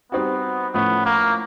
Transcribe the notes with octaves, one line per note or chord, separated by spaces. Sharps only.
G3 B3 C4 D#4 F#4
A2 F3 A3 B3 C#4
A#3